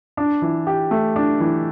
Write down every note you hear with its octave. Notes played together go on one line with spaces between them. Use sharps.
D4
E3
G4
A3
D4
E3